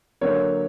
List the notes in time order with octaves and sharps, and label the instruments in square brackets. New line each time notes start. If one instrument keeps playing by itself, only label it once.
[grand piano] D3 F#3 A#3 C#5